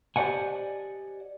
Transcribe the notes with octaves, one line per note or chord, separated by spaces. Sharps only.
G4 C5 D5 D#5 F#5 G#5